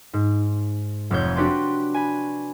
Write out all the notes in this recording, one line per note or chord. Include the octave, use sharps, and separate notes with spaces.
G#2
F1 F2 C#5 G6
D4 F#4 G4 B4 D5 C6
G#5 B5